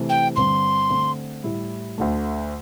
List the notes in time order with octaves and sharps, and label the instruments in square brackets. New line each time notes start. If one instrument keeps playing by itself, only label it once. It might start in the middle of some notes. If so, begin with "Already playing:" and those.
Already playing: [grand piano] C3 E3 A3
[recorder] G5
[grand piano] G2 D3 C4 [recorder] C6
[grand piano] D3 A3 C4
A2 G3 E4
D2 D3 A3